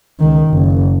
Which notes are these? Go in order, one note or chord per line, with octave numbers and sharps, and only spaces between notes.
C#2 D#3
F#1